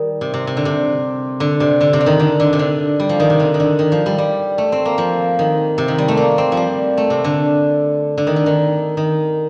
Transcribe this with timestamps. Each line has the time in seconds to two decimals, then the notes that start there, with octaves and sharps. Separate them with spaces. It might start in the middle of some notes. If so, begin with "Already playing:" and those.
Already playing: D#3 G3
0.21 C3
0.34 C3
0.47 C3
0.57 D3
0.65 C3
1.40 D3
1.60 C3
1.81 D3
1.93 C3
2.01 D3
2.06 D#3
2.20 D3
2.40 D3
2.53 C3
2.59 D3
3.00 G3
3.09 F3
3.20 D#3
3.30 C3
3.40 D3
3.54 D#3
3.60 D3
3.79 D#3
3.92 F3
4.06 G3
4.18 G3
4.58 A3
4.72 C4
4.85 A#3
4.98 F3
5.39 D#3
5.78 C3
5.88 D#3
5.98 G3
6.08 A3
6.17 A#3
6.38 C4
6.52 F3
6.57 G3
6.97 A3
7.10 C3
7.24 D3
8.18 D3
8.27 D#3
8.36 D3
8.46 D#3
8.97 D#3